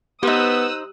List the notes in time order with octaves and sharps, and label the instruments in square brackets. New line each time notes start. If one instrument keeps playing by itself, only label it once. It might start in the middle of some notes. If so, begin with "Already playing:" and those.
[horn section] B3 [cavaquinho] D#4 C5 [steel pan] G4 [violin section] D#6 E6 F#6